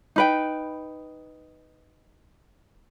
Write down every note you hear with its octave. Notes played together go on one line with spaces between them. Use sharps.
D#4 B4 G5